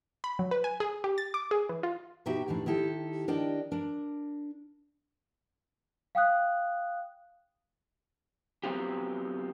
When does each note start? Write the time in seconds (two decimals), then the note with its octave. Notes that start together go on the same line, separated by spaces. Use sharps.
0.24 B5
0.39 F#3
0.51 B4
0.64 G#5
0.80 G#4
1.04 G4
1.18 A6
1.34 D6
1.51 G#4
1.69 E3
1.83 F4
2.26 B2 D#4 F#4 G4 E5 G5
2.48 D#2 A2 D#3 E3 D4
2.66 D#3 E4 G4 A4
3.28 D4 A#4 D5 D#5 G5
3.72 D4 A#4
6.15 F5 G5 D#6 F#6
8.63 F#3 B3 C4 F4 G4